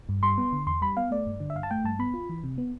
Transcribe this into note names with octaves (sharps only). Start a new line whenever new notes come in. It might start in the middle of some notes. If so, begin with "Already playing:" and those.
G2
G3 C6
B3
D3
E2 C6
G3 B5
B3 F5
A3 D5
G2
D3
E5
G2 F5
A5
A3 G5
G2 A5
B3 B5
F4
E3
C3
B3